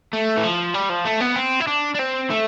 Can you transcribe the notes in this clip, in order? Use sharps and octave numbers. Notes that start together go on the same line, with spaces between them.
A3
E3
F3
G3
F3
A3
B3
C4
E4
D4
D4
C4
A3